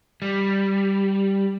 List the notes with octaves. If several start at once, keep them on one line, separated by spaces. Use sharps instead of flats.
G3